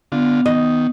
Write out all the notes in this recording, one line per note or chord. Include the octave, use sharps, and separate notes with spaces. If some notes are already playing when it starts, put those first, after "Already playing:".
D3 B3 F4
D#3 D#5